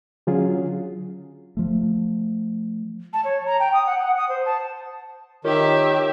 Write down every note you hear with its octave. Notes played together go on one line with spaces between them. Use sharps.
D3 F#3 C#4 F4 G#4
F3 A3
A5
C#5
A#5
G5
D#6
F#5
F#5
D#6
C5
A5
D#3 F4 G4 A#4 C#5 E5